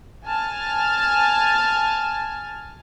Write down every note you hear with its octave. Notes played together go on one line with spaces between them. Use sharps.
G#5 A5 F6